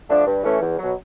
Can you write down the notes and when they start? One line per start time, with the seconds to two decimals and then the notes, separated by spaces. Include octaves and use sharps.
0.09 D3 F3 A3 D4
0.27 G2
0.44 E3 A3 C#4
0.62 E2
0.79 B2 F#3